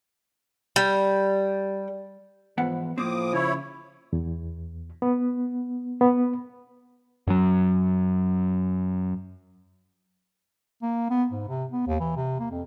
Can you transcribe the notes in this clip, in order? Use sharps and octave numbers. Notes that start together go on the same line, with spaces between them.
G3
E2 G#2 F3 B3 F#5
A2 F3 A#3 C4 D6 D#6
C#3 E4 C#5
E2
B3
B3
F#2 F#3
A#3
B3
G#2
C3
B3
D#2
E3
C3
A#3
F2